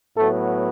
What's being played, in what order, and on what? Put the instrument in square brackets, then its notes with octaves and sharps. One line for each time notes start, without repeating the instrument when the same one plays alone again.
[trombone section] A2 F#3 A3 B3 A4